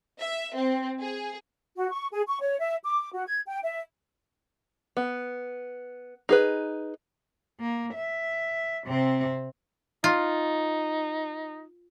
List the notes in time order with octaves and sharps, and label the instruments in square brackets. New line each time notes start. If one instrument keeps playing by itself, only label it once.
[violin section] E5
C4
G#4
[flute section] F#4
C#6
G#4
C#6
C#5
E5
D6
F#4
G#6
G5
E5
[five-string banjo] B3
D#4 G#4 B4
[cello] A#3
E5
C3 C4
[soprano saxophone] D#4 [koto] F4